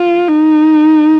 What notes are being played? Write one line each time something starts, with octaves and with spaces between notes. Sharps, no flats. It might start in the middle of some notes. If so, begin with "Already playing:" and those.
Already playing: F4
D#4